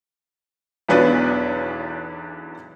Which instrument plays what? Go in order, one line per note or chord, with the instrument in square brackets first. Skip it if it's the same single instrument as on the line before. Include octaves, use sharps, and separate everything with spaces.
[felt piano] B1 E2 B3 D4 B4 C#5